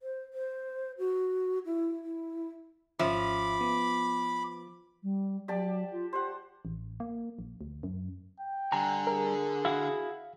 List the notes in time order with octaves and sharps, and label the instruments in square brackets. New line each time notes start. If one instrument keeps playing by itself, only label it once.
[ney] C5
C5
F#4
E4
E4
[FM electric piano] G#1 C#4 E5 [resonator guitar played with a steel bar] F3 [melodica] B5 D6
[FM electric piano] B3
[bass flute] G3
[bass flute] F#3 [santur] G4 D5 A5
[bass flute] F4
[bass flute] G4 [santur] C5 F#5
[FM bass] A1
A#3
A#1
D2
F#2
[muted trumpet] G5
[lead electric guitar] D3 [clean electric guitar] G3 G#5 A#5
[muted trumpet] G#4 [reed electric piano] A#4
[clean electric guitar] E4 F#4 F#5 [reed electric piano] F5